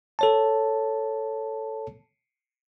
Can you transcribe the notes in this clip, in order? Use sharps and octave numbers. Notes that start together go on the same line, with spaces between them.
A4 C#5 A5